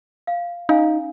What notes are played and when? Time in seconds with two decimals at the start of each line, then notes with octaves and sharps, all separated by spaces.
0.27 F5
0.69 C#4 D#4 F5 G#5